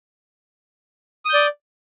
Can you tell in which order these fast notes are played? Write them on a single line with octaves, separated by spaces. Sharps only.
D#6 G6 D5